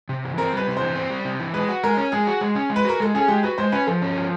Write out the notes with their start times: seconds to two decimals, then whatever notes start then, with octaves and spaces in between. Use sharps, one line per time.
0.09 C3
0.24 E3
0.38 C4 A#4
0.53 G3 B4
0.67 C3
0.77 E3 C5
0.95 C4
1.10 G3
1.25 C3
1.39 E3
1.54 G#3 B4
1.69 F#4
1.84 G#3 A#4
1.97 C#4
2.12 G#3 G#4
2.27 F#4
2.41 G#3
2.55 C#4
2.70 G#3
2.76 B4
2.85 F#4 A#4
3.00 G#3 A4
3.14 C#4 G#4
3.28 G#3 G4
3.43 F#4 B4
3.58 G#3 C5
3.72 C#4 B4
3.87 F3 A4
4.02 C#4
4.16 F3